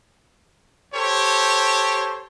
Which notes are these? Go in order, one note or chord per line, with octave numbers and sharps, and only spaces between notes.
G4 A4 C5 C#5